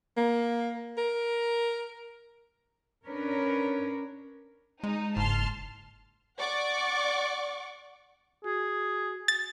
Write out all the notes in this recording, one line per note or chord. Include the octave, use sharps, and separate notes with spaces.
A#3
A#4
C#4 D4 A#4 B4 C#5
G#3 D#4
F#1 G#2 A5 C6 F6
D5 F#5 C#6 D6
F#4 G#4
A6